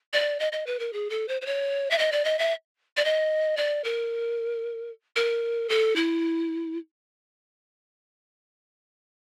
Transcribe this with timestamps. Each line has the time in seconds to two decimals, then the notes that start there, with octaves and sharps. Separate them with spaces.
0.13 D5
0.40 D#5
0.52 D#5
0.66 B4
0.79 A#4
0.93 G#4
1.10 A4
1.28 C5
1.41 C5
1.46 C#5
1.90 E5
1.99 D#5
2.12 D5
2.25 D#5
2.39 E5
2.97 D5
3.05 D#5
3.57 D5
3.84 A#4
5.16 A#4
5.69 A4
5.96 E4